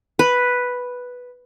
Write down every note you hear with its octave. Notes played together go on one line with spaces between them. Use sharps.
B4